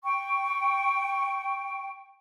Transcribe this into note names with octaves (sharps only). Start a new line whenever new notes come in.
G5 C#6